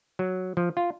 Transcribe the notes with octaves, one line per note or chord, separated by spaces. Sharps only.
F#3
F3
F4